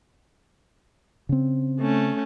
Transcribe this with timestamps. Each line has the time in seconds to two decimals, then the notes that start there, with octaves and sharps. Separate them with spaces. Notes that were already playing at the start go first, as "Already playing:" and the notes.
1.29 C#3 C4
1.80 A3 C#4